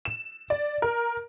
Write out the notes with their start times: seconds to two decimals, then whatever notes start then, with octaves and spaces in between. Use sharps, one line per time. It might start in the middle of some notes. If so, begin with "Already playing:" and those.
0.05 E7
0.50 D5
0.82 A#4